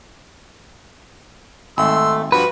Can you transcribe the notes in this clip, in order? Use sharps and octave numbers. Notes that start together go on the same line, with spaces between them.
G#1 A3 C6 E6
G2 F3 F#4 B4